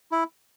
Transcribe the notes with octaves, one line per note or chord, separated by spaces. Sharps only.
E4